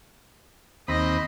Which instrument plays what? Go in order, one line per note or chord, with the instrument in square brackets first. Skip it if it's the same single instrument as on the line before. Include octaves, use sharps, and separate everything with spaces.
[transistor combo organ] D#2 C4 B5 [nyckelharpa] D#5